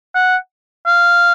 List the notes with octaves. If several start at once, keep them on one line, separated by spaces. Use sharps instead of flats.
F#5
F5